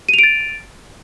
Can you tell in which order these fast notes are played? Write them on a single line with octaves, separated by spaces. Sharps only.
D#7 F7 D7 A6